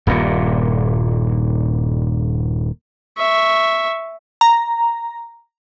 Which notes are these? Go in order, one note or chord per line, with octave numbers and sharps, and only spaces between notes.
D#1 G2 A#2
E5 C#6
A#5